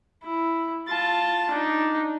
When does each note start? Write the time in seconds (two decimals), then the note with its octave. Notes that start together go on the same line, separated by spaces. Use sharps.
0.23 E4
0.88 F4 A5
1.51 D4 D#4